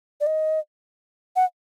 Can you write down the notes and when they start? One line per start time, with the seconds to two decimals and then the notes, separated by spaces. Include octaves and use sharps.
0.21 D5
0.26 D#5
1.36 F#5